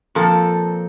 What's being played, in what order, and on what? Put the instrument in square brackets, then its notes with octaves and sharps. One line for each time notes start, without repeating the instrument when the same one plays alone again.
[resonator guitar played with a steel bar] A#2 F3 C4 A4